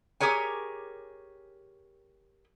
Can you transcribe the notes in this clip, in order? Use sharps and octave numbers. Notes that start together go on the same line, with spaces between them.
G4 G#4 A#4 C#5 G#5